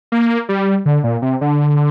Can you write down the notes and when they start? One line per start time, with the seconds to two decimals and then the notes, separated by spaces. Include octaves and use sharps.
0.12 A#3
0.49 G3
0.86 D3
1.04 A#2
1.22 C3
1.41 D3